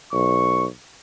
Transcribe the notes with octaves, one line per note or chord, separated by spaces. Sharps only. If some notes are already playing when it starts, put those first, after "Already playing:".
B1 C#6